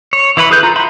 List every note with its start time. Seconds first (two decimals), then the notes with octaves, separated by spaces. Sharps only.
0.13 C#5
0.37 E3 E4 B4 B5
0.51 G#4 A4 B4 G6
0.63 F4 A#5
0.76 F#4 E5 B5 C6